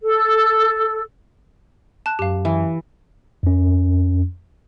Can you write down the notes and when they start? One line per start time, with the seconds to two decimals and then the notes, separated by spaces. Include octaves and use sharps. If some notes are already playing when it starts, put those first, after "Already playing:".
0.02 A4
2.06 A5 F#6
2.19 F#2 G4 F5
2.45 E3
3.43 F2 C#4